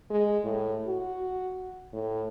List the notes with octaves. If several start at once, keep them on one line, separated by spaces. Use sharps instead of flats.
G#3
A2
F#4
A2